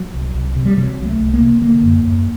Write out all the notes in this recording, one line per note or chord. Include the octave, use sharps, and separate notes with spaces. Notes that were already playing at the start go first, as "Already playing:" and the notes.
Already playing: F#3
C2
C2
C3
G3
C3 F#3
C2
A3
C2
A#3
C3
D3 A#3
F#2
F#2